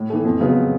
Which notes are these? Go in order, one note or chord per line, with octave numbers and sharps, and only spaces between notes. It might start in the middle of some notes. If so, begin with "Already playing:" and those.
Already playing: A2
E3 A3
F2
C#3 F#3 B3